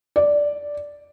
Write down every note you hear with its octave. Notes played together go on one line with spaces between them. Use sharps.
D5